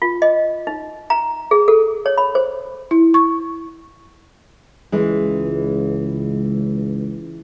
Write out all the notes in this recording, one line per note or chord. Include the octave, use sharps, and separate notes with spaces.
F4
D#5
D#4
A#5
G#4
A4
C#5
B5
C5
E4
C#6
C#2 E3 G#3